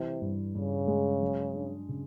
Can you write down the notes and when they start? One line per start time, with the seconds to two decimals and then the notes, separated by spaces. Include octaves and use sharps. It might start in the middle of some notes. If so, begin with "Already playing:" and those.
Already playing: C3 E3 G3 E4
0.21 G2
0.55 G2 C#3
0.88 G#3
1.21 F#3
1.55 D4
1.89 C#3